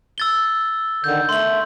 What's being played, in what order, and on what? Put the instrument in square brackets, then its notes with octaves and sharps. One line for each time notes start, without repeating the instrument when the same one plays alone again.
[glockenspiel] E6 A6 G7
[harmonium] D3 D#3 [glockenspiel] G6
[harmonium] A3 [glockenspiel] C6 F#7